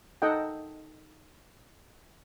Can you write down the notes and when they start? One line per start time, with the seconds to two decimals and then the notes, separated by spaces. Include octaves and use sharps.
0.22 D#4 A4 D#5 F#5 G5